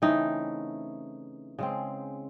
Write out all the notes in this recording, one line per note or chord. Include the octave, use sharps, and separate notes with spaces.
C#3 E3 A3 C4 D#4
C#3 G#3 C4